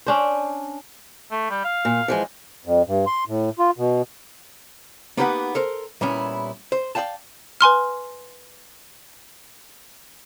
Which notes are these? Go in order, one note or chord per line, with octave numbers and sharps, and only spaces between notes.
C#4 D4 C5
A3
G3
F5
A#2
E3 F3 G#3
F2
G2
C6
A2
F4
B2
A#3 B3 D#4 G4 B4 F#5
A4 A#4 C5
A#2 G3 B3 C#4 E4
C5
D5 D#5 F5 G5 A5
B4 G#5 C6 F6